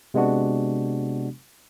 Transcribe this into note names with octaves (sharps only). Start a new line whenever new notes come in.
C3 G#3 B3 D4 F#4